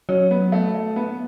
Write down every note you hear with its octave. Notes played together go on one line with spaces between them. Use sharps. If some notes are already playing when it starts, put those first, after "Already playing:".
F#3 C#4
B3
A3
A3
B3